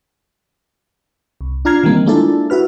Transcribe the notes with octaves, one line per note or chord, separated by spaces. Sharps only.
C2
D4 F4 A#5 F6 G#6 C7
D#3 E3 G3 A#3 C4
G#3 A#3 D4 E4 F4 A4
E4 F#4 B4 F6